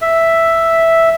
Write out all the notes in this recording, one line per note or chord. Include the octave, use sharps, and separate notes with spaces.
E5